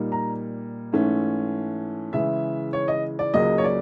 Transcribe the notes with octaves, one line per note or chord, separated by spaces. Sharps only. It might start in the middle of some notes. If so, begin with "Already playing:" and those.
Already playing: A#2 G3 A#3 D#4
A#5
G#2 E3 A3 C#4
C#3 E3 G#3 E5
C#5
D#5
D5
C#2 C#3 F#3 A#3 D#5
C#5
D5